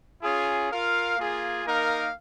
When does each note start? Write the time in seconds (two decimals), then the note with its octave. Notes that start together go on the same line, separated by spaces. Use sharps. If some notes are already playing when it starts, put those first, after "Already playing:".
0.23 C#4 F4 G#4
0.71 F4 A#4 F5
1.18 A#3 F4 G#4
1.65 A#3 D#4 A#4 F5